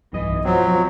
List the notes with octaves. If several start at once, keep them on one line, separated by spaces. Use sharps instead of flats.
B1 G2 E3 D#5
F3 F#3 C4